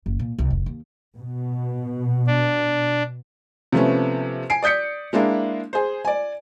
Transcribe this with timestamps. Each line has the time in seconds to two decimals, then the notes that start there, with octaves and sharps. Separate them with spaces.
0.06 F#1
0.19 A#2
0.39 C2
0.51 F1
0.66 D#2
1.17 B2
2.27 D4
3.72 C3 F3 A3 B3 C#4
4.50 G#5 C7 D7
4.63 D5 D#6 G6 B6 C#7
5.13 G#3 A#3 D4 E4
5.73 G#4 C5
6.05 D5 G#5